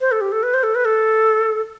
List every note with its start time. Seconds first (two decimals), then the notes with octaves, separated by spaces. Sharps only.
0.01 C5
0.12 A4
0.21 G4
0.32 A4
0.43 B4
0.54 C5
0.63 A4
0.75 B4
0.85 A4